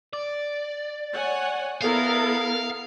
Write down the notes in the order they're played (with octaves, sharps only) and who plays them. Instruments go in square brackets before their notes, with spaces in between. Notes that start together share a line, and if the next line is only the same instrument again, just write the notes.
[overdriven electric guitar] D5
[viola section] C#5 F#5 G#5
[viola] B3 [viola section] E4 A4 A#4 [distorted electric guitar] F5